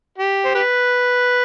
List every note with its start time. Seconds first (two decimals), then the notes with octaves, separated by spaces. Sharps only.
0.18 G4
0.45 C5
0.55 G4 B4